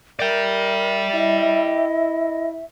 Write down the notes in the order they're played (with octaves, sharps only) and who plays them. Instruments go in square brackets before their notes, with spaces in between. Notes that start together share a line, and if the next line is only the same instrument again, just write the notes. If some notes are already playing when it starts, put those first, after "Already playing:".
[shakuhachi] A#4 [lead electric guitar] D5 G5 [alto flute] E5
[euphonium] E4 [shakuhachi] D#5